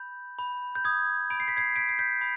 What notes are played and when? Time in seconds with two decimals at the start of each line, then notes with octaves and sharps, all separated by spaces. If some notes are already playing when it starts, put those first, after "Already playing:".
Already playing: B5 G6
0.38 B5
0.75 G6
0.85 D#6 G#6
1.30 B5 D7
1.40 C7
1.48 B6
1.57 G#6 C7
1.76 G6 B6 D7
1.89 C7
1.99 G6 B6
2.21 B5